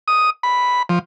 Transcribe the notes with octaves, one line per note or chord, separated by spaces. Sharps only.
D#6
B5
F3